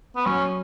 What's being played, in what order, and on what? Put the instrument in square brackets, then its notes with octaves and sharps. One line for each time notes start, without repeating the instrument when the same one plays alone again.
[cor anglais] B3
[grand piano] F#3 [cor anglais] C#4